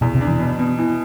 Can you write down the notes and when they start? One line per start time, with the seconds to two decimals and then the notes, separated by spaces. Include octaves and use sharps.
0.01 E2 B2
0.15 C3
0.21 D4
0.27 E3
0.40 B2
0.59 B2
0.79 E3